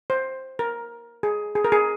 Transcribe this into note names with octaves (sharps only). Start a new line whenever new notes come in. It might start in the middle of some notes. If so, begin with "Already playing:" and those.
C5
A#4
G#4
G#4
A#4
G#4